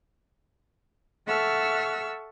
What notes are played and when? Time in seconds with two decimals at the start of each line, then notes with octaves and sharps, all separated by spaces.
1.26 A4 E5 F#5 C#6 E6 F6